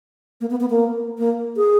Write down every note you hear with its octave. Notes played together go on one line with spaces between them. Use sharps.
A#3
B3
B3
A#3
A#3
G#4